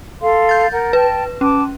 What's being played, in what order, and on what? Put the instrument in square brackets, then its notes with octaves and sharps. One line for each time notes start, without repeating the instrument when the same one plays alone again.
[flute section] A4 F5 C6
[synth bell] G6 A6
[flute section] A#4 F#5
[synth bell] B4 [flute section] G5 A5
[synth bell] C#4 [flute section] A5 D6